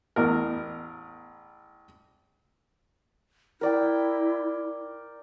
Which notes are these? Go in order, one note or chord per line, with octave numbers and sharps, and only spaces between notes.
A1 E2 A#4
E4 A#4 D5 G5